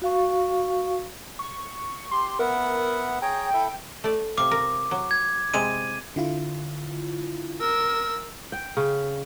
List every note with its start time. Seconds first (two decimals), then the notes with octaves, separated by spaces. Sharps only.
0.02 F#4 F5 C#6
1.39 C#6
2.11 G4 C6
2.39 B3 A#4 E5 F#5
3.22 G#4 C#5 G5 A#5
3.54 E4 A4 E5
4.04 A3 D5
4.38 C3 F5 D6
4.51 A#4
4.91 F#3
5.11 G#6
5.54 C3 G#3 E4 D#7
6.16 D3 E4 F4
7.60 A#4 E6
8.52 G5
8.77 C#3